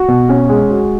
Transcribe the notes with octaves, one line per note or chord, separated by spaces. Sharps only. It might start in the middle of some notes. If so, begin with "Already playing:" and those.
Already playing: F#4
B2
C#4
G#3
F#4